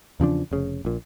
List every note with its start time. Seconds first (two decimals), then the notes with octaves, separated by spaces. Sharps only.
0.20 E2 C#3 F3 D4
0.51 F1 C#3
0.85 A#1 A#2